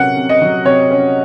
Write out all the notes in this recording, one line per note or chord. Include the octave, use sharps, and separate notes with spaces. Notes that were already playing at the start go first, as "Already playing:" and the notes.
Already playing: C3 F#3 C#4 A#4 F#5
C3
D#5
F#3
C3 C#5
C#4